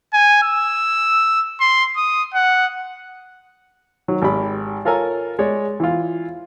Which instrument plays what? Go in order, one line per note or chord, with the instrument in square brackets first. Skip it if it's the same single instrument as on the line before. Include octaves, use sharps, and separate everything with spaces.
[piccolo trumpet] G#5
E6
C6
D#6
F#5
[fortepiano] D#3 F#3
G#1 G4 B5
F4 A4 A#4 C#5 G#5 A#5
G#3 C#5 D5
E3 F4